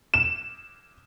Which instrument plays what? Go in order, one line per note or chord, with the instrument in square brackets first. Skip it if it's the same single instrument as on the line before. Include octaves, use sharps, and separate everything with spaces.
[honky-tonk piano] E7